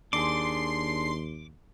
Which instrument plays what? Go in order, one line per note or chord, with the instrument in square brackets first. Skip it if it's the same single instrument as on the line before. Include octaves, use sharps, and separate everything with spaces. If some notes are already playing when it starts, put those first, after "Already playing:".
[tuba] D#2 [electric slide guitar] D4 G#4 [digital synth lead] C6 [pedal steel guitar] D6